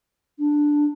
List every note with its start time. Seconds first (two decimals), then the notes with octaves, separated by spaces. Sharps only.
0.39 D4